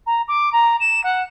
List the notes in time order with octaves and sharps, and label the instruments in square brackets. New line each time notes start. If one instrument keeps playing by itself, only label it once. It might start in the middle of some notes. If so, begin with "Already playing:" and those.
[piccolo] A#5
D6
A#5
E7
F#5